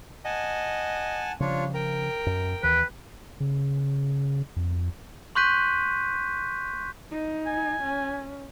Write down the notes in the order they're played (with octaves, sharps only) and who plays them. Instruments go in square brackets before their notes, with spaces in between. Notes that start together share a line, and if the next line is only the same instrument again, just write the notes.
[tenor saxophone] D#5 [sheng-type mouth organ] F#5 G#5 A5
[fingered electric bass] C#3 F3 [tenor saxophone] G3 [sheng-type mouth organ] D4 F4 C#5
[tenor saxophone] A#4 [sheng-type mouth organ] G5
[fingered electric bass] F#2
[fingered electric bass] D#2 E3 [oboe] B4
[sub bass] C#3
F2
[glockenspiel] C6 C#6 F#6 G6 B6 D#7
[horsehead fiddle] D#4
[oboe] G#5
[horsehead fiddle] C#4